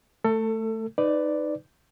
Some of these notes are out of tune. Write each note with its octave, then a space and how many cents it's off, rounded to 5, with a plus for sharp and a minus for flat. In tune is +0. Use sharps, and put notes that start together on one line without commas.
A3 +0 A4 +25
D#4 -5 B4 +20 D5 +0